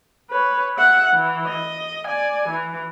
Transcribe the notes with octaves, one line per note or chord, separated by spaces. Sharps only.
B4 C#5
E5 F#5
E3
D#5
D5 G#5
E3